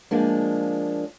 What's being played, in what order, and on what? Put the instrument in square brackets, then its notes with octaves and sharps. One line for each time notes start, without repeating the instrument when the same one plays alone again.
[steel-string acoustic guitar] F3 G#3 A#3 D4